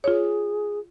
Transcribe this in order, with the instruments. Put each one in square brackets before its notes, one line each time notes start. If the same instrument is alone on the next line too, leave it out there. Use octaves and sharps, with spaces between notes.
[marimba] F4 C#5 [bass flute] G#4